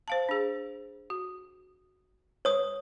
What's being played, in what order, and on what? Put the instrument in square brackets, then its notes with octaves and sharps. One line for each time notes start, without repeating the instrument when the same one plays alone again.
[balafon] C5 F5 A5
D4 G#4
F#4
[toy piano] C#5 D#6